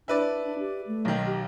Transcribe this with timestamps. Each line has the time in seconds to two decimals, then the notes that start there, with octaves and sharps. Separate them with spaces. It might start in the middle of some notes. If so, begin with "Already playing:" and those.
0.08 D4 E4 B4 D5
0.59 G4
0.87 A3
1.05 B1 D#3
1.26 G4